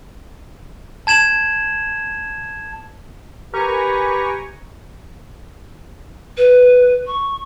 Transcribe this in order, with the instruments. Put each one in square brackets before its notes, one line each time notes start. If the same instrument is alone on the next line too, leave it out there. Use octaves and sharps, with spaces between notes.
[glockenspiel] A5 G#6 E7 F#7
[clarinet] G4 [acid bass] A#4 [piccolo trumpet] B4 [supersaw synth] G#5 A#5 C#6
[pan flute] B4
C#6